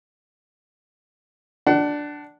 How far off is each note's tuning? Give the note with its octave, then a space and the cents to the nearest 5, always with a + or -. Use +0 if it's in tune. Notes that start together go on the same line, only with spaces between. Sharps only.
D4 +0 F#5 +30